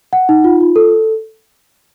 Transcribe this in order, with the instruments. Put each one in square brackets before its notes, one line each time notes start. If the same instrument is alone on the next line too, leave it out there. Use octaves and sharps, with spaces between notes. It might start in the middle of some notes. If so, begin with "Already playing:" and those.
[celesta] F#5
D#4
F4
F4
A4